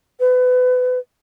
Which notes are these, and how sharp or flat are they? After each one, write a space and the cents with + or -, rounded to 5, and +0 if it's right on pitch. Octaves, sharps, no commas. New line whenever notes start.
B4 +30